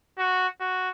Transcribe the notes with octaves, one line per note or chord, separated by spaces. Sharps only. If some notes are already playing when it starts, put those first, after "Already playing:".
F#4
F#4